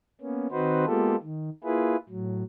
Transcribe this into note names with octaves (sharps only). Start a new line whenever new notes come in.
A#3 B3 C#4
D#3 C4 D#4 F#4 B4 C5
G#3 A#3 B3 F4 G4 A4
D#3
A#3 E4 F4 G#4 B4
A2 F#3